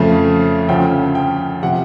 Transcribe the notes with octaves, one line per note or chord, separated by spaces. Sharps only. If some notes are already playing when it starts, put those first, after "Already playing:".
Already playing: F2 C#3 F3 A3
D2 C#3 F3 G5
G5
C3 F3 F#5